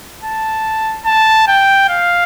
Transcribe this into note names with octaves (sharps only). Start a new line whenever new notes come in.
A5
A5
G5
F5